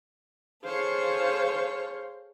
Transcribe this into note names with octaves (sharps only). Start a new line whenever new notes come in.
G#4 A4 C5 C#5 F5